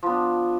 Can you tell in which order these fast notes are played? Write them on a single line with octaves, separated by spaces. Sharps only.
F3 B3 D4